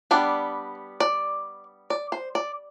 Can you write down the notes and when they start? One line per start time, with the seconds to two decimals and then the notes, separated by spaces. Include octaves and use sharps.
0.11 G3 B3 D4 D5
1.00 D5
1.90 D5
2.12 C5
2.35 D5